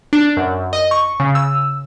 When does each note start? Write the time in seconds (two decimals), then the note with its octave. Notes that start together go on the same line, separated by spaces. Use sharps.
0.13 D4
0.37 F#2
0.73 D#5
0.91 C#6
1.20 C#3
1.35 E6